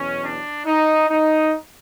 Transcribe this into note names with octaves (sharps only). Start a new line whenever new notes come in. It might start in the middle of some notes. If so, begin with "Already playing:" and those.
Already playing: E2 B2 F#3 C#4
D4
D#4
D#4